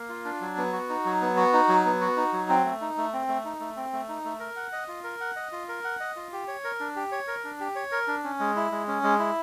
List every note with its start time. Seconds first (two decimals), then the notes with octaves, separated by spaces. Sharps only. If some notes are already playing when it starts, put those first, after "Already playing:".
Already playing: A#3
0.09 F4
0.25 D4
0.41 F#3
0.57 B3
0.73 F#4
0.89 D#4
1.05 F#3
1.21 B3
1.37 F#4
1.53 D#4
1.68 F#3
1.85 B3
2.01 F#4
2.17 D#4
2.33 F#3
2.49 C4
2.65 A3
2.81 D#4
2.97 A3
3.13 C4
3.28 A3
3.45 D#4
3.60 A3
3.76 C4
3.93 A3
4.09 D#4
4.24 A3
4.40 A#4
4.56 F#5
4.73 D#5
4.88 F4
5.04 A#4
5.20 F#5
5.36 D#5
5.52 F4
5.68 A#4
5.84 F#5
6.00 D#5
6.16 F4
6.32 G4
6.48 C#5
6.64 A#4
6.80 D4
6.96 G4
7.12 C#5
7.27 A#4
7.44 D4
7.60 G4
7.76 C#5
7.92 A#4
8.08 D4
8.24 C#4
8.40 G#3
8.56 E4
8.71 G#3
8.88 C#4
9.04 G#3
9.19 E4